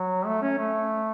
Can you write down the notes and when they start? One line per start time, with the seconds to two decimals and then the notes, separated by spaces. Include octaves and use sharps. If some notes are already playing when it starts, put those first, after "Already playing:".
Already playing: F#3
0.26 A3
0.42 C#4
0.58 A3